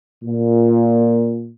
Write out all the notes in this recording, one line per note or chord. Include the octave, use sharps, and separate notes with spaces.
A#2